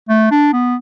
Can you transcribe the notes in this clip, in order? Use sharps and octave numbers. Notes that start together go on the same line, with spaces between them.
A3
D4
B3